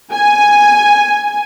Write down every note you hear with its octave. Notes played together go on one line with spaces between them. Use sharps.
G#5